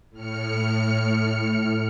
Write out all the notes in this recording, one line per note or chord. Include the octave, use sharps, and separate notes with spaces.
A2 F6 C#7